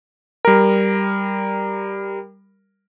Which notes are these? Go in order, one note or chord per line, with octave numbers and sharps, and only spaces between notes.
G3 A#4